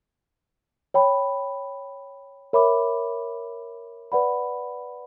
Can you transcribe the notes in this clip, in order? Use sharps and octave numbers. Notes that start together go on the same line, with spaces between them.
C#5 G5 B5
A#4 C#5 E5 B5 D6
B4 D5 F#5 B5